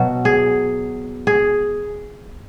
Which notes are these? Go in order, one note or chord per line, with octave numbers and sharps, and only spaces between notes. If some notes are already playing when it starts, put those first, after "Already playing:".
Already playing: B2 F#3
G#4
G#4